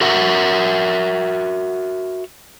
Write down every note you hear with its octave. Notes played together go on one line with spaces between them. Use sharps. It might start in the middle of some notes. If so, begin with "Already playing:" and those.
F#4 A#4 E5 F#5